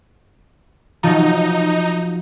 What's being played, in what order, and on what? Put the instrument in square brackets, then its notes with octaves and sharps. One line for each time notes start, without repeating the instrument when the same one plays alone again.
[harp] F3 F#3 [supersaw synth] D#4